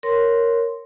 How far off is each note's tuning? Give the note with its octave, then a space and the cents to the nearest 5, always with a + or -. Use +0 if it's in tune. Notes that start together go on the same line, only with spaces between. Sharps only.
A#4 +0 C#5 +0 C6 +0